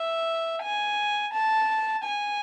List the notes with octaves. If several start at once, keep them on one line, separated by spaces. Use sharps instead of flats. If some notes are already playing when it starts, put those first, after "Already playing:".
Already playing: E5
G#5
A5
G#5